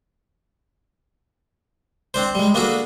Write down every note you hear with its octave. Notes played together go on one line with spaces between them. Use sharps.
C4 D4 C5
G3 G#3
A#3 B3 D4 F#4 G#4 A4